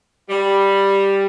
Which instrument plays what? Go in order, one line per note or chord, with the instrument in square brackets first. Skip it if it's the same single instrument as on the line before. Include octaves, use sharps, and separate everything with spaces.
[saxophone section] G3